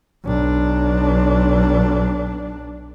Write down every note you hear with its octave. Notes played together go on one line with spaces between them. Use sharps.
B1 D4